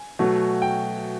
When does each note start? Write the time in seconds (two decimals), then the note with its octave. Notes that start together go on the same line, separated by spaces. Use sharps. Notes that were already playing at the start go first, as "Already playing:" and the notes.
Already playing: G#5
0.19 B2 F#3 A3
0.62 G5